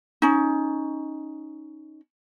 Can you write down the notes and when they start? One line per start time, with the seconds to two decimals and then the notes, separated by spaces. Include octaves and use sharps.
0.22 C#4 D#4